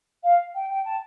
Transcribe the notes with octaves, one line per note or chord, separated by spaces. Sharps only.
F5
G5
G5
A5